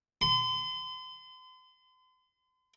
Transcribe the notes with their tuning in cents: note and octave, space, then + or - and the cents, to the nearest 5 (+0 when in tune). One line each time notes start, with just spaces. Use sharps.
C6 -40